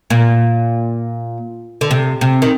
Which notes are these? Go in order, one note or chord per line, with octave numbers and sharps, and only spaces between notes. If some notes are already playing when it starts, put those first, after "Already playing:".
A#2
D3
C3
C3
D#3